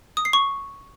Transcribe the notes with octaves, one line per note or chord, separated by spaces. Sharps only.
D#6
C7
C#6